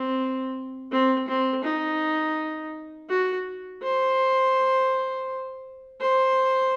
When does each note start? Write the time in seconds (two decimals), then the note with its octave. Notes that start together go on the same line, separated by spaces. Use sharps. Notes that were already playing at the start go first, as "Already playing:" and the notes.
Already playing: C4
0.92 C4
1.28 C4
1.64 D#4
3.10 F#4
3.83 C5
6.01 C5